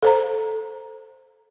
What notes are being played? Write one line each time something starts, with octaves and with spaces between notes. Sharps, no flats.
A4 C5 A#5